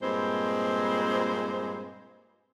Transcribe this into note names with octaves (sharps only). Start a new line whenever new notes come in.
G2 A#2 G#3 C4 C5